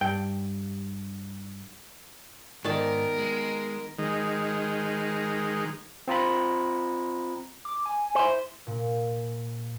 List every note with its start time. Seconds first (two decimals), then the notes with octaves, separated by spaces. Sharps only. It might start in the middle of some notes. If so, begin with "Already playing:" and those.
0.01 G2 G5
2.65 G#2 D#3 B3 A#4 D5 A5
3.18 G#3
3.99 D#3 G#3
6.08 C4 F4 A#5 B5
7.65 D6
7.86 G#5
8.15 E4 C5
8.67 A#2